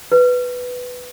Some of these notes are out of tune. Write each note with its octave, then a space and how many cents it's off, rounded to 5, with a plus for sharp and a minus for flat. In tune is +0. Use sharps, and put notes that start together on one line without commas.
B4 +5